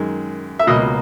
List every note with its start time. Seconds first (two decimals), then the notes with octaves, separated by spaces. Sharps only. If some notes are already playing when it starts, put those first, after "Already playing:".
Already playing: F#2 D#3 G#3
0.59 E5
0.67 C#2 B2 A#3 D#5